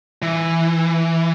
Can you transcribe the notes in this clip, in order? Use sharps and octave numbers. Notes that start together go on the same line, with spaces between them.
E3